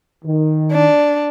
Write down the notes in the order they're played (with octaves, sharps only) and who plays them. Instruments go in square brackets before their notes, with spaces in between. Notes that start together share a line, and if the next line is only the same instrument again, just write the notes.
[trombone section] D#3
[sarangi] D4